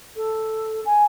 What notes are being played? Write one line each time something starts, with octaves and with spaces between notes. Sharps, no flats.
A4
G#5